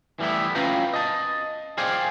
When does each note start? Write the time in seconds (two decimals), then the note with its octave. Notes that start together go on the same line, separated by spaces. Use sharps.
0.19 E3 G3 A3 B3 E4
0.55 C#4 F4 B4 F5 G5 A#5
0.93 D#5 A5
1.78 G#4 C5 D5 F5 G5 G#5